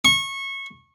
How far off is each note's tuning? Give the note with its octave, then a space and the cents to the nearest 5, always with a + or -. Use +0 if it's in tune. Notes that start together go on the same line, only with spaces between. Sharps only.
C#6 -20